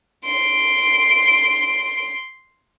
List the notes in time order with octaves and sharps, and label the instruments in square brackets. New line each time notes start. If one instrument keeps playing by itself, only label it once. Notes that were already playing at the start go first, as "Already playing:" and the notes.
[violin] C6 D7